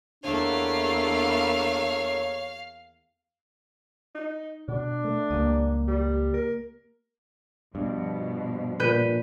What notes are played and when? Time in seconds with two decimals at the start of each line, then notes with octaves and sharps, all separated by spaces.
0.24 E2 A3 A#3 D4 C#5 F5
4.15 D#4
4.68 B2 D4
5.04 A3
5.30 C#2 G2 A#3 G4 D#6
5.88 G3
6.34 A#4
7.75 G2 B2 F3
8.80 A#2 B4 G6 D#7